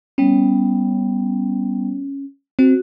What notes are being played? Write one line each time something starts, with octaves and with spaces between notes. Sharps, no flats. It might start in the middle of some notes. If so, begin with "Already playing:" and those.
G3 B3 C#4
C4 F#4